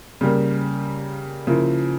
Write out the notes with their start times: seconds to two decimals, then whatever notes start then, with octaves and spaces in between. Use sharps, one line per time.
0.21 C#3 G3 A#3
1.47 C#3 F3 A#3 E4